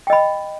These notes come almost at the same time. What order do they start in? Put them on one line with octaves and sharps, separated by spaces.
G5 D#5 B5